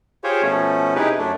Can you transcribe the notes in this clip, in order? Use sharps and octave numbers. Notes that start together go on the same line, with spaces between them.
F4 G4 G#4 C5 C#5
B2 F3 A3 C#4
C3 D#4 E4 G4 G#4 B4
F#2 A3 D4